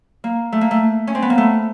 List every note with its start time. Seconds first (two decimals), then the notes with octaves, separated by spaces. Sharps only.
0.24 A#3
0.52 A3
0.61 A#3
0.71 A3
1.07 C#4
1.15 C4
1.22 B3
1.30 A#3
1.38 A3